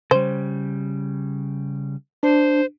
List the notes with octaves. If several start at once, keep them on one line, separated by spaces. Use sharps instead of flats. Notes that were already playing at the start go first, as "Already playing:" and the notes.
C#3 G3 C5
D4 C5